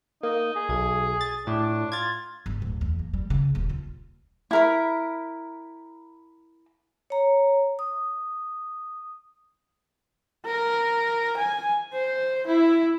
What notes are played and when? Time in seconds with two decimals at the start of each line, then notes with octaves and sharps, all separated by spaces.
0.23 A#3 D#4
0.56 G#4
0.69 B1 G#6
1.21 A6
1.47 A2 D4
1.92 F4 G#6 A6
2.46 G1
2.62 D1
2.81 E2
2.99 A#3
3.13 G3
3.30 C#3
3.55 D#1
3.69 F4
4.51 E4 A#4 B5
7.10 C#5 A#5
7.79 D#6
10.45 A#4
11.37 G#5
11.93 C5
12.47 E4